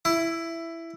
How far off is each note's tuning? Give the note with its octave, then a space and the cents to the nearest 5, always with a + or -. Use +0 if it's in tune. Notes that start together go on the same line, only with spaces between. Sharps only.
E4 +10